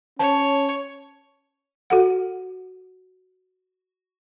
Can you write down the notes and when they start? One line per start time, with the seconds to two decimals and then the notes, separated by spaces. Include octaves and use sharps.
0.19 C#4 C#5 A5
1.90 F#4 A4 F#5